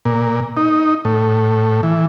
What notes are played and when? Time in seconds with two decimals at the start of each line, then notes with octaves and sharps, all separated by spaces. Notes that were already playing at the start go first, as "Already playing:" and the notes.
0.05 A#2
0.57 D#4
1.05 A2
1.83 E3